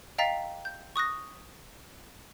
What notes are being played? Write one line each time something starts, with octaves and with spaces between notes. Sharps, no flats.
D#5 F5 G5 A#5 A6 B6
G6
C#6 D#6 F#6 A#6